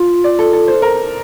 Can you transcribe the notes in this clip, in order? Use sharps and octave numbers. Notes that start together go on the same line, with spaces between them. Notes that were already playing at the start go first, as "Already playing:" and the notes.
Already playing: F4
D5
A4
A4
C5
A#4